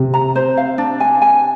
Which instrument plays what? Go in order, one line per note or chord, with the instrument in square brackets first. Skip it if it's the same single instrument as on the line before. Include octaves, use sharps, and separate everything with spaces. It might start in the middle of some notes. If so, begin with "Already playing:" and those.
Already playing: [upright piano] C3
[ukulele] A#5
C5
F5
D4
G#5
G#5